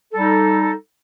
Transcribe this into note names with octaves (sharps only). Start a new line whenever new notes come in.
G3 D#4 A4